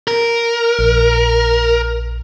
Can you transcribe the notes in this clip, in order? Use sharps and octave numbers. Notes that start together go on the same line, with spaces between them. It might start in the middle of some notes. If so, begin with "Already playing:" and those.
A#4
A#1